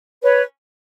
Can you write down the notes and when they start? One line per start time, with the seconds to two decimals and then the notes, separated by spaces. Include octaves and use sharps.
0.23 B4 C#5